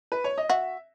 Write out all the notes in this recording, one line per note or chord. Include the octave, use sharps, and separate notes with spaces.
B4
C#5
D#5
F#4 E5